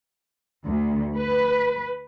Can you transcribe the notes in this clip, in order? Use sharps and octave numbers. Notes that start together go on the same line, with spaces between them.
D2
B4